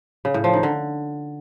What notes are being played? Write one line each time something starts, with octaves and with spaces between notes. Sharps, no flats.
C#3
A2
F3
D#3
D3